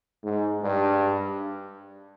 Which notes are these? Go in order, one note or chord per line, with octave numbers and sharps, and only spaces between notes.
G#2
G2